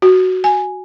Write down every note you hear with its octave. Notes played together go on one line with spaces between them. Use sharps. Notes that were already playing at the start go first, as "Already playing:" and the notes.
F#4
G#5